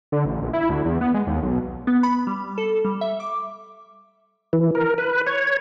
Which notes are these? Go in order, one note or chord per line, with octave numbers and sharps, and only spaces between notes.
D3
A1
A#1
E4
D2
E2
B3
G#3
D#2
B1
B3
B5
G3
A4
G3
E5
D6
E3
A#4
B4
C#5